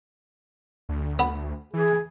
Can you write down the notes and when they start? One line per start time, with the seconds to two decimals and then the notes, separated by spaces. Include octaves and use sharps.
0.89 D2
1.19 B3
1.74 E3 G#4